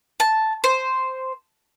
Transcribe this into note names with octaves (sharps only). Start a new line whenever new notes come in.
A5
C5